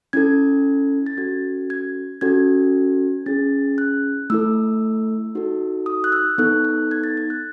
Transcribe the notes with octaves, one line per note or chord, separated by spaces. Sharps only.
C#4 E4 A4 G#6
A6
C#4 F#4 A4 G#6
G#6
C#4 F#4 A4 G#6
C#4 E4 G#4 A6
F#6
A3 E4 A4 E6
D#4 F#4 A4
D#6
F#6
E6
B3 D#4 A4 F#6
F#6
G#6
A6
G#6
F#6